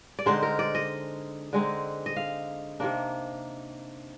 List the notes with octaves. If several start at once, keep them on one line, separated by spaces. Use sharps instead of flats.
D5
D3 G#3 C4 D#4 C5
A#4
D5
D#5
D3 G#3 C4 D#4
D#5
F5
C3 D#3 A#3 D4